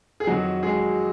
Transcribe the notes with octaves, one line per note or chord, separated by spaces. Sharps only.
G#4
F2 D#3 F#3 F#4
G#3 G#4